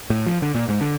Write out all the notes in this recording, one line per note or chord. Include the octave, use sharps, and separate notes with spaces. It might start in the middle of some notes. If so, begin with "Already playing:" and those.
A2
F3
D3
A#2
G#2
D3